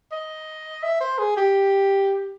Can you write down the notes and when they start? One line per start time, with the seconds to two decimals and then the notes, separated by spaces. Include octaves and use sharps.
0.12 D#5
0.83 E5
1.00 C5
1.19 G#4
1.37 G4